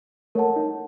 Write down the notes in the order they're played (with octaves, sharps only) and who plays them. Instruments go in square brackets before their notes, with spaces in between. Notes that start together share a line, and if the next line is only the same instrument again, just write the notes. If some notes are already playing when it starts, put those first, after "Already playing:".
[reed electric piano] A3 [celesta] A#4 C#5 F#5 A5
[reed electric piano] D#4